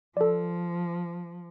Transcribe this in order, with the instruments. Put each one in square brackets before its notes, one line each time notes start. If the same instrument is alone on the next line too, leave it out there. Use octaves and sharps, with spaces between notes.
[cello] F3 [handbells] A4 D5